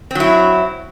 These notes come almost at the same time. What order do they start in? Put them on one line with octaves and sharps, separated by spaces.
C4 F#3 E4